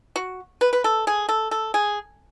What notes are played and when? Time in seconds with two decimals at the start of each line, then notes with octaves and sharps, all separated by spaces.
0.16 F#4
0.61 B4
0.73 B4
0.84 A4
1.07 G#4
1.29 A4
1.51 A4
1.74 G#4